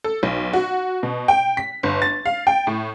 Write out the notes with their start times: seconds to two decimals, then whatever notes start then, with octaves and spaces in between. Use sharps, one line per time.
0.04 A4
0.23 B1
0.53 F#4
1.03 B2
1.28 G5
1.57 B6
1.83 G1
2.02 A6
2.26 F5
2.47 G5
2.67 A2